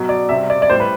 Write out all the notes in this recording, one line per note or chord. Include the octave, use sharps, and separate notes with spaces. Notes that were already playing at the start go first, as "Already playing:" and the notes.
Already playing: B2 F#3
D5
C3 G3 E5
D5
D5
A2 G3 C5
B4